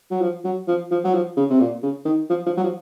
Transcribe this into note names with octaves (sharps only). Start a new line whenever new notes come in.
F#3
F3
F#3
F3
F3
F#3
F3
C#3
C3
A#2
C#3
D#3
F3
F3
F#3
F3